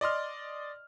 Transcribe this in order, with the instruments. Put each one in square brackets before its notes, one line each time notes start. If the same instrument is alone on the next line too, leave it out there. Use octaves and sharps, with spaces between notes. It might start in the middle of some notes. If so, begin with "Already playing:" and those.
[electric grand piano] D5 D#5 C6 F6